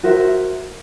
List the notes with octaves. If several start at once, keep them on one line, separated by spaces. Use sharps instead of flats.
F#4 A#4 C5 E5